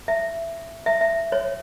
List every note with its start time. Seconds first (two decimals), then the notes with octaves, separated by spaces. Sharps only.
0.08 E5
0.86 E5
1.01 E5
1.32 C#5